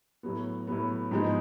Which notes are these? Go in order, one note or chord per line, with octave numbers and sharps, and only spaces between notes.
A2 F#3 B3
A2 F#3 B3
G#2 F3 G#3 B3 D#4